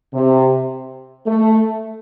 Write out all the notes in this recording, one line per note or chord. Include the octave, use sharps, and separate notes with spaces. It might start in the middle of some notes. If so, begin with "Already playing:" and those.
C3
A3